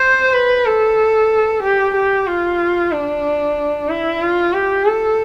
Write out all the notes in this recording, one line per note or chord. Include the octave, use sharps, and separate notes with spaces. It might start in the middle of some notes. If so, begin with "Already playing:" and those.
Already playing: C5
B4
A4
G4
G4
F4
D4
E4
F4
G4
A4